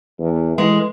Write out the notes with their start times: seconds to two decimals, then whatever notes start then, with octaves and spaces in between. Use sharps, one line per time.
0.19 E2
0.58 E3 G#3